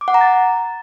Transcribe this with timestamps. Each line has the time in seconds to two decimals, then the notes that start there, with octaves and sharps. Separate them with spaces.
0.01 D6
0.08 F#5
0.14 A#5
0.21 A6